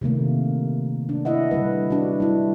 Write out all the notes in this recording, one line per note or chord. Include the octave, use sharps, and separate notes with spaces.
C3 D#3 A3 A#3
D4
E4 D#5 E5 F#5
D3 G3 B4
D4 F#4
G3 E4